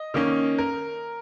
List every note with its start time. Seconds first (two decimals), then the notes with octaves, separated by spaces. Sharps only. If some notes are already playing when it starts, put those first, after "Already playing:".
Already playing: D#5
0.14 D#3 A#3 C#4
0.58 A#4